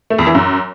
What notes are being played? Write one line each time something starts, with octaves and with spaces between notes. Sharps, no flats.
A3
E2
E3
F#2